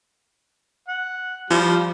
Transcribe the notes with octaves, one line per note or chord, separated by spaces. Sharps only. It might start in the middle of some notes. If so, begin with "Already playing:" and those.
F#5
F3 G3